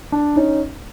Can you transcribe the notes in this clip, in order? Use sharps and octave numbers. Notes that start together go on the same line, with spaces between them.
D4
C#4 D#4